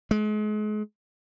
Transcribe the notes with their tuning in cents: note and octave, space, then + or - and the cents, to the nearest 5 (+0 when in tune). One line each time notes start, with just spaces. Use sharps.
G#3 +35